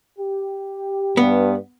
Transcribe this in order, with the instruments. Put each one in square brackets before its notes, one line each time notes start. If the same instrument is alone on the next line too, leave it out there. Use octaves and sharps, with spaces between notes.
[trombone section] G4
[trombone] G2 [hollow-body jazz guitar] B3